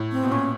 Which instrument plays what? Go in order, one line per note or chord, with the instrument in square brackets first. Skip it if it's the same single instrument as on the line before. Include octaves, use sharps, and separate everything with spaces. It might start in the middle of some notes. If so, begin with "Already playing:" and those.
Already playing: [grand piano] A2
[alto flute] C4
[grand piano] B2
[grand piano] A#2 [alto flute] C#4